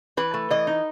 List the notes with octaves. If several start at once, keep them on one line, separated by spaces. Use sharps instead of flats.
E3 B4
A3
E3 D#5
D#4